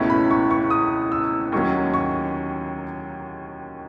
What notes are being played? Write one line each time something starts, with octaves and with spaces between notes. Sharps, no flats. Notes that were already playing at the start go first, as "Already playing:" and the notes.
Already playing: C#2 B2 A3 C#4 E4
B5
C#6
C#6
D#6
E6
D#2 D#3 F#3 C#4 C#6
C#6